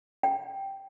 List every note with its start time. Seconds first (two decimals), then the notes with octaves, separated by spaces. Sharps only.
0.23 G5